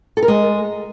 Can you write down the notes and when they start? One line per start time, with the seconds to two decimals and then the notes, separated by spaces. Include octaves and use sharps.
0.17 A4
0.23 A#4
0.28 G#3